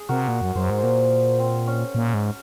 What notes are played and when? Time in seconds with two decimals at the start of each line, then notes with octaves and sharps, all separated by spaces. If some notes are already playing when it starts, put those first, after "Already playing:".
Already playing: G#4
0.09 C3 F#4 A#4
0.28 A#2
0.41 F#2
0.55 F#2 G#4 C5
0.70 G#2
0.78 C5
0.83 A#2 F#4 A#4
1.39 C4
1.67 C#4
1.95 A#2
2.14 G#2